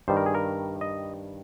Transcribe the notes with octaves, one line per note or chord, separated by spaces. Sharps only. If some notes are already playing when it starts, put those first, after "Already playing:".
G2 D#3 G3 C5
A#4
G#4
A#4
D#5